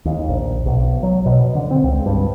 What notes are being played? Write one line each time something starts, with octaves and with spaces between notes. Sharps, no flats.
D#2
A#1
B1
F#3
B2
D3
C4
C#2
G2